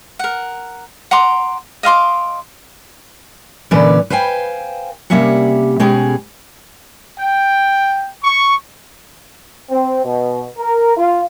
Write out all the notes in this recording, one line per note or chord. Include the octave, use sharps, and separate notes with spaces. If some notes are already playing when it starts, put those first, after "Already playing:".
A#4 F#5
F#5 A#5 C6 D6
D#5 F5 C6 D6
A#2 D3 E3 C#4 B4 D5
B4 C5 F5 G5 G#5
C3 G3 A#3 C#4 E5 F#5
B2 G#3 C#4 G4 G#4
G5
C#6
C4
B2
A#4
F4